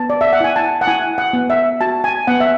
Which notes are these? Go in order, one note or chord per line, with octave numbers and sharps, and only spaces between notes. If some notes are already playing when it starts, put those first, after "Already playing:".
Already playing: B3 A5
D5
E5
F#5
E4 G#5
A5
F#5
E4 G#5
F#5
B3
E5
F#4 A5
G#5
B3 F#5
E5